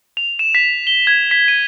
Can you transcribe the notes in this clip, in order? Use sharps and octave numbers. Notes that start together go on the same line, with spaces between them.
F7
E7
B6
G7
G#6
B6
D#7